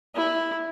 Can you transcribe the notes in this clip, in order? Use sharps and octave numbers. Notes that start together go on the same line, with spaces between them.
E4